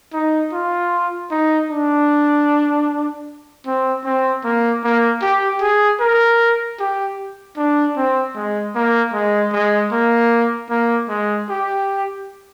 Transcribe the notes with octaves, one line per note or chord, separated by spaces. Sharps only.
D#4
F4
D#4
D4
C4
C4
A#3
A#3
G4
G#4
A#4
G4
D4
C4
G#3
A#3
G#3
G#3
A#3
A#3
G#3
G4